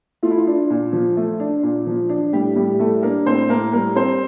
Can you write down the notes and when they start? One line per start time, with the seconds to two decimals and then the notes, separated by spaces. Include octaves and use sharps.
0.23 A3 F4
0.31 E4
0.38 F4
0.47 D4
0.70 A#2
0.93 F3
1.17 A3
1.40 D4
1.63 A#2
1.87 F3
2.09 D4
2.33 A2 G3 G4
2.56 A2 G3 G4
2.75 G4
2.79 G3 A3 A4
3.02 A#3 D4 A#4
3.26 A2 C4 C5
3.49 A2 A#3 A#4
3.72 G3 A#3 A#4
3.96 C4 C5